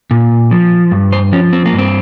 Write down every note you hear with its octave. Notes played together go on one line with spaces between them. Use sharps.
A#2
F3
G2
C5
F3 C#4
C4
A#3
G2
C4